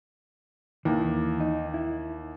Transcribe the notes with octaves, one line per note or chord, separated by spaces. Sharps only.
D#2 E3
D#4
E4